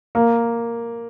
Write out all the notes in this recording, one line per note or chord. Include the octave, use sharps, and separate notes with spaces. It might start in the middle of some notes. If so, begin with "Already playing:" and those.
A#3